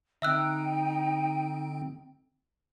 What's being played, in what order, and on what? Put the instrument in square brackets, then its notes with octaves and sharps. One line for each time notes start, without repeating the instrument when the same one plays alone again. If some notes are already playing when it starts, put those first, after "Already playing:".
[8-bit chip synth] D3 C4 [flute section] D#4 G5 [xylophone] E5 E6 F#6